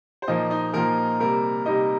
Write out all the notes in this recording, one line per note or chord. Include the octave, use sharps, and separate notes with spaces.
C5
A#2 F3 A#3 D#4 D#5
D#4 D#5
A#2 F3 A#3 A#4
C3 G3 A#3 A#4
C3 G3 A#3 D#4 D#5